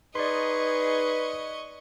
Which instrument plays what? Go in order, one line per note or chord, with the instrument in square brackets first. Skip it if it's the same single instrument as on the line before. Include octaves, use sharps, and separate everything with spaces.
[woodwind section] D#4 G#4 [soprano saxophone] B4 [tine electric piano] D5 C6 [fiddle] D#5 C#6